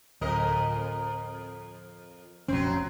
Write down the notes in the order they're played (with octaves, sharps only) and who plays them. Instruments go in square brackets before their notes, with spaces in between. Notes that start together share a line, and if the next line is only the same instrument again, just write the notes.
[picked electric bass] D1 [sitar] F2 A#4 D#5
[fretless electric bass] F1 A#1 [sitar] F#3 C4 [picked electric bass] C#4